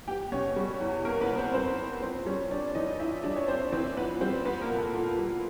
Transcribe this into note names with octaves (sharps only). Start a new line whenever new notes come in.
B3 G4 G5
B2 C#4 C#5
G3
E2
A#3 B3 A#4
B3 B4
B2
C4 C5
G3 C4 C5
E2
C4 F4 C5
G3 C#4 C#5
C4 D4 D5
E3 D#4 D#5
E4 F4 E5
G3 D4 D5
C#5
C4 C5
E3 C4 C5
B3 F4 B4
G3 C4 C5
B3 C4 B4
A#3 A#4
A#2
A4
F4 A4
G3